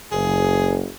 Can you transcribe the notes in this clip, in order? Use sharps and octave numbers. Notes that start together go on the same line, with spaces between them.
F#1 G#4